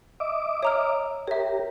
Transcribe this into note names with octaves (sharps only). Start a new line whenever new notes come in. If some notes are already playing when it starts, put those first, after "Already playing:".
D#5 E5 D6
C#5 A#5 F6
G4 A#4 C#5 E5